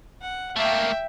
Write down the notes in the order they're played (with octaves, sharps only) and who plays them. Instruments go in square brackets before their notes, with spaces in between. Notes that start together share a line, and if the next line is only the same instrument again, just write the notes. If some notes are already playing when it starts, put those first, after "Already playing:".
[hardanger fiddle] F#5
[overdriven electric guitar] A3 A#3 [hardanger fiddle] E5 G5